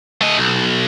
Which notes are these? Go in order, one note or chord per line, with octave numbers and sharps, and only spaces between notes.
A3 D#5
B1